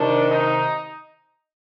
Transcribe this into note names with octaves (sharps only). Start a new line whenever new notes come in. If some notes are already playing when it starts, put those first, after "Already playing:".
Already playing: C3 D#3 D4
D#4